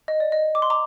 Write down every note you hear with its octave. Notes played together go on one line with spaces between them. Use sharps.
D#5
D5
D#5
D6
C6
A#5 D6